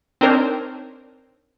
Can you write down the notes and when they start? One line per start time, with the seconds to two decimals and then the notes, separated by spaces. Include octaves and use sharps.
0.21 C4 D4 D#4 A#4 C5 C#5